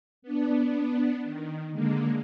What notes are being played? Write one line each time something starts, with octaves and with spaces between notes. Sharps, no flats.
B3 D4
D#3
D3 G#3 A#3